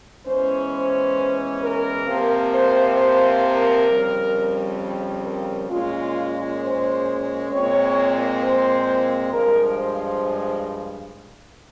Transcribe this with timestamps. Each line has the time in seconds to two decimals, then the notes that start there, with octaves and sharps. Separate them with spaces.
0.24 E2 E3 G#3 C#4 C5
0.70 C5
1.61 A#4
2.05 C3 F3 A#3
2.51 C5
2.96 C5
3.42 A#4
3.87 F2 C#3 G3
5.23 A#4
5.68 A#2 G#3 C#4 F4
6.59 C5
7.50 A#2 G#3 C4 C#5
8.40 C5
9.31 G2 F3 G#3 A#4
9.76 C5